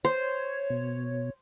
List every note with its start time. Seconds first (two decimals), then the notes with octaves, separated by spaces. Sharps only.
0.05 C5 C#5
0.70 B2